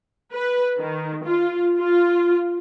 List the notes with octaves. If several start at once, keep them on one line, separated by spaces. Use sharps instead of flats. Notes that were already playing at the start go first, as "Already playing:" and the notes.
B4
D#3
F4
F4